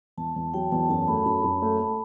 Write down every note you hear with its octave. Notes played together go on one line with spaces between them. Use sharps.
E2 A5
E2
F#3 G5
E2 A5
F#2 A5
A3 B5
F#2 B5
F#2
A3
A3